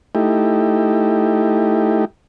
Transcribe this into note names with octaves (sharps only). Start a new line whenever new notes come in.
A3 D#4 E4 G4